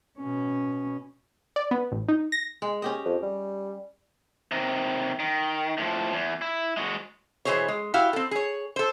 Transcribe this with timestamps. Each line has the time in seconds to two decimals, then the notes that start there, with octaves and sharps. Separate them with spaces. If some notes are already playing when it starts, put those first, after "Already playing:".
0.20 B2 C#4
1.56 D5
1.71 B3
1.91 A1
2.08 D#4
2.32 A#6
2.62 G#3
2.82 C#4 G4 D#5
3.05 F2
3.23 G3
4.52 C3 D#3
5.20 D#3
5.78 A2 F3
6.13 E2
6.42 E4
6.77 G#3 F#4
7.45 B2 E3 G3 G#4 C5 C#5
7.68 G#3
7.94 E4 F#4 G4 F5
8.13 C4 A4
8.31 G#4 C#5
8.76 A4 C5